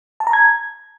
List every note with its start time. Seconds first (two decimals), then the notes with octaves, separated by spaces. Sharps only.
0.20 A5
0.27 A#5
0.33 G#6